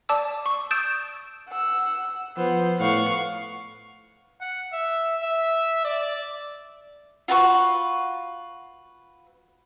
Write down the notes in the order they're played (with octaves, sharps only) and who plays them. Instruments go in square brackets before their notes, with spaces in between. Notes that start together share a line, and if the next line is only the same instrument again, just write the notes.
[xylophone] D5 A5 D6 E6
C#6
D#6 E6 G6 A6 D7 E7
[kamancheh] F#5 E6
[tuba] F3 [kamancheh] B3 C5
[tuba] A2 [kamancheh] B3 F#5 [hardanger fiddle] F5 C#6
[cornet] F#5
E5
E5
D5
[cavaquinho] F4 F#4 B4 C#6